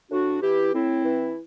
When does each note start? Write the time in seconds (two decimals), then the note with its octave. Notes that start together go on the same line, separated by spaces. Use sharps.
0.11 A2 D4 F#4
0.42 E3 E4 G4
0.74 A2 C4 E4
1.04 E3